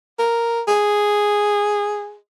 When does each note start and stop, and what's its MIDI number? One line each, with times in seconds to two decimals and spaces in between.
0.19 0.62 70
0.68 2.16 68